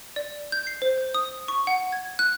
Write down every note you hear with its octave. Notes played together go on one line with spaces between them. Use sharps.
D5
G6
C7
C5
G6
D#6
C#6
F#5
G#6
F#6